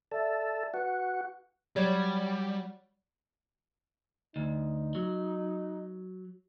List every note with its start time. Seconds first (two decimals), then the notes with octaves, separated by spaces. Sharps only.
0.11 A4 D5 E5
0.74 F#4 B4
1.76 F#3 G3 C#5 D5
4.36 D2 D#4
4.95 F#3